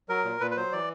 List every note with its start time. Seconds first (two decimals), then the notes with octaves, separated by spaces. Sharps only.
0.09 F#3 A#4
0.24 A#2
0.40 A#2 B4
0.51 B4
0.57 F#3 C5
0.72 E3 D5